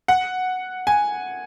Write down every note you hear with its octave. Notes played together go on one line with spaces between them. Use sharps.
F#5
G#5